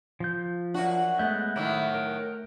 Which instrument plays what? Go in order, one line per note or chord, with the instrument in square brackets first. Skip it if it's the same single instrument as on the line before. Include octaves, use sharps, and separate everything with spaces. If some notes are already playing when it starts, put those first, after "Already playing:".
[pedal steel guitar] F3 G6
[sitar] F#2 F#4 [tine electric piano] D4
[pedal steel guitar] G#3 B3 E5 [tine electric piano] A3 F#6 G6
[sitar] A2 D#3 F#3 [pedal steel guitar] E4 D6
[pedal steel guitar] A#4